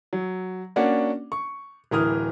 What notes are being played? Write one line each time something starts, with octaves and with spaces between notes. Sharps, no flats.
F#3
A#3 C#4 D4 F#4 D5 F#5
C#6
D1 E3 A#4 D#6 F6